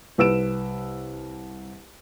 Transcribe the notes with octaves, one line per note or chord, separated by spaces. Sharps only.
C2 B4 E6 D7 E7